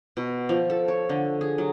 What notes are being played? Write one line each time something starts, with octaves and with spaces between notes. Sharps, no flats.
B2
F3
A4
C#5
D3
G#4
F#3